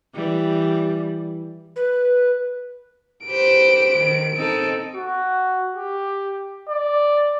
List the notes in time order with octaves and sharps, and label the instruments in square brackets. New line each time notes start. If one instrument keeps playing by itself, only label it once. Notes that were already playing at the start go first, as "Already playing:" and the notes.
[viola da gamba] E3 G3
[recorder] B4
[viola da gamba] G4 B4 C5 [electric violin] D7
[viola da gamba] D#3
C4 D#4 A4
[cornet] F#4
G4
D5